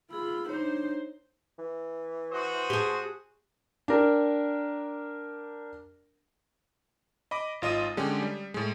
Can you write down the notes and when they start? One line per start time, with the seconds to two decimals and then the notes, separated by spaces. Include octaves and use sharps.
0.11 F4 G#4 B5 E6
0.49 D4 D#4 C5 C#5
1.59 E3
2.32 F#4 C5 D#6
2.70 G4 G#4
3.88 D4 G4 A#4
7.31 D#5 B5 D6
7.62 G#1 F4 D#5 D#6 D#7
7.97 D3 G#3 C#4 G4
8.22 G3
8.54 A2 G#3